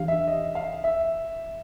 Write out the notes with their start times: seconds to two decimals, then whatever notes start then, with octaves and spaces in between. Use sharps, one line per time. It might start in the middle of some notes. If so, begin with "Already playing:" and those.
Already playing: E3 D4 G4 F5
0.08 E5
0.27 D#5
0.55 F5
0.84 E5